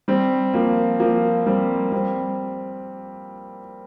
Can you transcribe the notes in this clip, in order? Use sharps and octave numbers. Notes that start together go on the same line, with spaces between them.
G3 C4
F3 A#3
F3 A#3
G3 C4
G3 C4